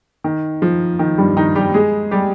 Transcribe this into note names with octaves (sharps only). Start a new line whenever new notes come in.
D#3
F3
D#3
G2 G3
D#3 D#4
G3 G4
G#3 G#4
G3 G4